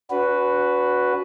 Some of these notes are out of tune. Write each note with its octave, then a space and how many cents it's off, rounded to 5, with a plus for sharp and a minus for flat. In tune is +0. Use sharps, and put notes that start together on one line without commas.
D4 -45 F#4 +0 B4 +0